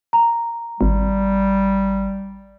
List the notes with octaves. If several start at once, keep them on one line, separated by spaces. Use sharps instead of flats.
A#5
G#1 G3